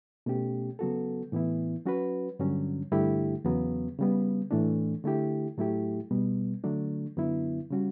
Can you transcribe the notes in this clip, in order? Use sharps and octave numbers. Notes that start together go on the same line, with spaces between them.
B2 A3 C#4 G4
C#3 F#3 B3 F#4 A4
A2 E3 B3 E4
F#3 C#4 F#4 B4
G2 D3 F#3 C#4
G2 D3 A3 E4 G4
E2 C#3 F#3 B3
C#3 G3 B3
A2 E3 A3 D4
D3 A3 E4 G4
A2 F#3 A3 E4 G4
B2 G3 B3
D3 F#3 A3 D4
F#2 D3 F#3 B3 E4
C#3 G3 C#4 F#4